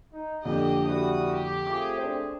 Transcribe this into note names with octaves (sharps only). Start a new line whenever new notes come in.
D#4
F2 A#2 D3 F3 D4 G4 D#5
G3 E4 F#4 D#6
G4
A3 C4 F4 G#4 D6
D4 C5